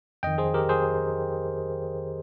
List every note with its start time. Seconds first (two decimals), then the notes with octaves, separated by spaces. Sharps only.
0.23 F2 D#3 D#5 G5
0.38 G#4 C5
0.54 G4 A#4
0.69 G#4 C5